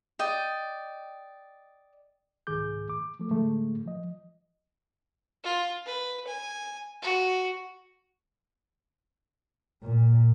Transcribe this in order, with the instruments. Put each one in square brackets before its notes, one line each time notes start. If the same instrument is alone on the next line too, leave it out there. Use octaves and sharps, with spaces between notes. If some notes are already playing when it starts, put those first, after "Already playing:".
[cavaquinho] D5 D#5 G5
[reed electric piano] C2 G#2 D#3 G#4 D6 G6
D6
F3 A3
A2 D3 G#3 A3
F3 D#5
[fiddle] F4
B4
G#5
F#4
[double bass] A#2